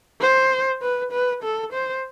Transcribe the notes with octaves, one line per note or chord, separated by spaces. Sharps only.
C5
B4
B4
A4
C5